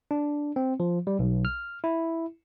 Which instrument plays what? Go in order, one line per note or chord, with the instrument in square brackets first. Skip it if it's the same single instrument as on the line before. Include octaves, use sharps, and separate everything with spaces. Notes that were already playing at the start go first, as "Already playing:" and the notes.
[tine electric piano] D4
C4
F3
G3
B1
F6
E4